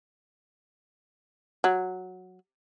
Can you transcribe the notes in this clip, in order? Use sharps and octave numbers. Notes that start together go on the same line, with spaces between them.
F#3